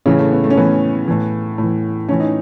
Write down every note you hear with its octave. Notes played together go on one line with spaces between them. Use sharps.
A2 C#3 E3 C#4
A3
B3
A3
C#4
A2 E3 B3
A2 E3
A2 E3
A2 E3 C#4
D#4